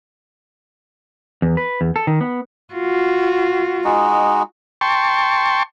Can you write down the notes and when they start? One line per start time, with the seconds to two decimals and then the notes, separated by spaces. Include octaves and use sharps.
1.42 E2
1.57 B4
1.81 E2
1.96 A4
2.07 D#3
2.21 B3
2.74 F4 F#4
3.84 G#3 D#4 F#4
4.81 G5 A5 C6 C#6